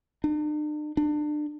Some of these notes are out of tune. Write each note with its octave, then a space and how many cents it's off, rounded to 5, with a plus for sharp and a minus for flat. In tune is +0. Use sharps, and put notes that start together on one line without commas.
D4 +45
D4 +30